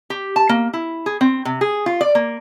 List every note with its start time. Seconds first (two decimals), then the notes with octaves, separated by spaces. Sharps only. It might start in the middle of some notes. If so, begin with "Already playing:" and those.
0.10 G4
0.36 A5
0.49 A#3
0.73 E4
1.06 G#4
1.21 C4
1.45 C3
1.61 G#4
1.86 F4
2.01 D5
2.15 A#3